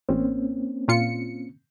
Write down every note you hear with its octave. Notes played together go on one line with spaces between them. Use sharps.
A1 A#3 C4 C#4
A#2 F4 C#7